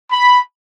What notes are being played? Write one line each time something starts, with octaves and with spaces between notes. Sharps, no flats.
B5